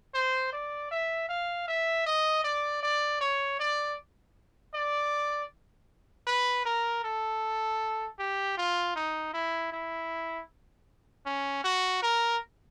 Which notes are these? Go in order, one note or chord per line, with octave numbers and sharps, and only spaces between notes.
C5
D5
E5
F5
E5
D#5
D5
D5
C#5
D5
D5
B4
A#4
A4
G4
F4
D#4
E4
E4
C#4
F#4
A#4